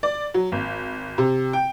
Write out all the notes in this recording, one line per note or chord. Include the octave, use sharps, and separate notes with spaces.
D5
F#3
G#1
C3
G5